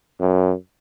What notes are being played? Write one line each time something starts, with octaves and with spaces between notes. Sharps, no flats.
F#2